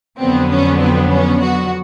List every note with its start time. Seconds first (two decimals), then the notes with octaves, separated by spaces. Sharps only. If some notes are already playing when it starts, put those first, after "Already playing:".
0.19 F2 D3 F#3 B3 C4
0.50 C#4
0.80 C4
1.11 C#4
1.42 F#4